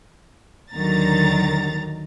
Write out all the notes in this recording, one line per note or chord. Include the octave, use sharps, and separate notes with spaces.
D#2 D3 D#3 F#3 A#5 A6